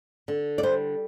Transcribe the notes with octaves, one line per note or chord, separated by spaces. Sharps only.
D3
D5
G3 C5